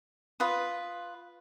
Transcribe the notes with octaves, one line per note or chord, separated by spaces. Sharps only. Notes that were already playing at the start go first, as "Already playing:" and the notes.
F4 B4 D#6